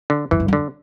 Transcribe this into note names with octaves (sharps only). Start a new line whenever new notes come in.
D3
F#2 E3
G2
F#2
D3